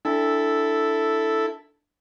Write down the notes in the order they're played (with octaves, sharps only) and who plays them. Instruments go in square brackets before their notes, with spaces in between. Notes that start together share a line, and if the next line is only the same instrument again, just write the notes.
[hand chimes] D4 [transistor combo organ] E4 A4